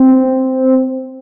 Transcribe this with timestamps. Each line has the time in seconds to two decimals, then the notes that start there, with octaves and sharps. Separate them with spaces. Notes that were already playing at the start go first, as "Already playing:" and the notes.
Already playing: C4